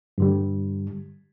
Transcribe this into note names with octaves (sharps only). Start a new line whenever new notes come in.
G2 D3 G3